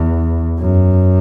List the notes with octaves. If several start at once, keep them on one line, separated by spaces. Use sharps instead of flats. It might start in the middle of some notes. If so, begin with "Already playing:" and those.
Already playing: E2
F#2